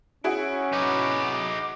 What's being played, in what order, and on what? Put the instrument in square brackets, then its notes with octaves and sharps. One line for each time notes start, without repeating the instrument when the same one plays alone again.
[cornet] C#4 [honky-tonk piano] E4 F#4 G#4 [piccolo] D7
[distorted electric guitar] D#4 B4 [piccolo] D6